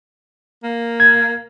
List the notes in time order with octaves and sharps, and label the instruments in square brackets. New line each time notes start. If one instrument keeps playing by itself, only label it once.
[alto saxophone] A#3
[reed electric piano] G#6